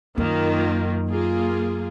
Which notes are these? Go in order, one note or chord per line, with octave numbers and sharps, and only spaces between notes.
F#2 D#3 A#3 F4
A#3 F4 G#4